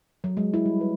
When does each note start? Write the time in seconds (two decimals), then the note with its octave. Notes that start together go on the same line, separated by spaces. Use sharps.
0.24 F#3
0.37 G#3
0.54 E4
0.66 G3
0.81 B4